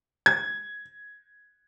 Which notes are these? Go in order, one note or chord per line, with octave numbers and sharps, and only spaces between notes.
G#6